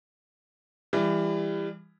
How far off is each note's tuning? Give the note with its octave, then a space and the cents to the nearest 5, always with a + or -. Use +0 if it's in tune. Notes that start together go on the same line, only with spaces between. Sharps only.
E3 +20 G3 +30